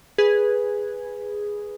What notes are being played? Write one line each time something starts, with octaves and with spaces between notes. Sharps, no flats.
G#4 B4